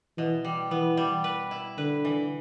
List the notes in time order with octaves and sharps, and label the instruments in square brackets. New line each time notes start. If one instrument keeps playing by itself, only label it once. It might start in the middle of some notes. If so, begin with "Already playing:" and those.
[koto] B2 [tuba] E3
[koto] G3
[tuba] E3 [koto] B3
[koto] G3
B4
E4
[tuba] D3 [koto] B4
[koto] E3